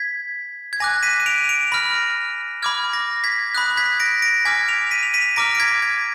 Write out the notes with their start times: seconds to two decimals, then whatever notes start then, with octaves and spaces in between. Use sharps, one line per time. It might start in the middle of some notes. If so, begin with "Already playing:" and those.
Already playing: G#6 B6
0.73 G#6
0.80 G#5 D6 F#6 A#6
1.03 B6 D#7
1.20 D#7
1.26 D7 F7
1.49 D7 F7
1.72 B5 F6 A#6
2.63 B5 D6 F6 G#6
2.93 A#6
3.24 G#6 B6
3.54 B5 D#6 F#6
3.77 G#6 B6
4.00 A#6 D7
4.22 A#6 D7
4.45 G#5 D6 F6 G#6 B6
4.68 D7 F7
4.91 B6 D#7
5.03 F7
5.14 B6 D#7
5.36 A#5 D6 F6 A#6 D7
5.55 D7
5.60 G#6 B6
5.82 G#6